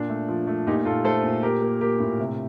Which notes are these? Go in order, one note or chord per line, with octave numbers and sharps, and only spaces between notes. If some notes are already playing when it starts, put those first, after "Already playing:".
Already playing: A#2 D4
A3
F3
A3
A#2 D#4 G4
A#2 F4 A4
A3 A4 C5
A#2
A#3 G4 A#4
A#3
A#3 G4 A#4
A2
C3